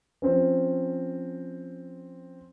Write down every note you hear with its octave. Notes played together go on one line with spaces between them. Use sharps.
F3 C4 C#4